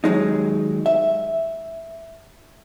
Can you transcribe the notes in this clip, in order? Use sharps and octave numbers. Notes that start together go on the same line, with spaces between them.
D#2 F#3 G#3 D#4
E5